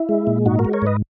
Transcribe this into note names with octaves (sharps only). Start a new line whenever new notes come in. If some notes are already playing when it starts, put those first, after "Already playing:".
Already playing: E4
G#3
A#2
G#2 D#4 F#4
F#4 A#4
G#3
A#4 C#5
G#2 B4 D#5